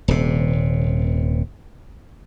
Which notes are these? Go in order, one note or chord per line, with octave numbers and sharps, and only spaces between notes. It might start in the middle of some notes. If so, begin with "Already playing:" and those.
D#1 C3